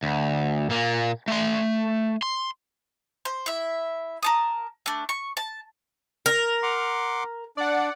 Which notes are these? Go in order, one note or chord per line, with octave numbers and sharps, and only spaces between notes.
D2
A#2 A#3
A3 C6
C6
C5
E4 E5
A#4 A5 D#6
A3 D4
C#6
A5
A#4
F#5 C6 D6
D4 D5 F#5